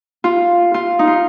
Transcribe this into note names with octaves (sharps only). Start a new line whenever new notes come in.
F4
F4
D#4
F4